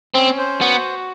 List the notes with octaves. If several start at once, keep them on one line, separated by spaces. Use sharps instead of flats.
C4 C#4
C5
B3 F#4